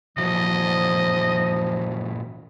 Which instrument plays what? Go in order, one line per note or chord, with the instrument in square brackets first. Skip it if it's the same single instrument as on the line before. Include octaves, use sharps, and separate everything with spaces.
[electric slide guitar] A#2 E3 F#4 [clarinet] F3 [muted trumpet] D#5